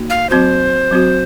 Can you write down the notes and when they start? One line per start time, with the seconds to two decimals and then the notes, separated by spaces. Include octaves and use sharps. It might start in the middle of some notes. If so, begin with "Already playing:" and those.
Already playing: A#3 D#4 F#4
0.10 F5
0.30 F#3 C4 F#4 C5
0.91 F#3 C4 F#4